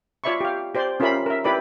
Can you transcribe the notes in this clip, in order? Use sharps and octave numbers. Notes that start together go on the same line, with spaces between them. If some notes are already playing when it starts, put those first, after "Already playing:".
F4 C#5 D5 E5 B5 C#6
G4 F5
G4 C5 D5 C6
C#4 F4 G4 A#4 E5 B5
A#4 E5
E4 G4 B4 D5 B5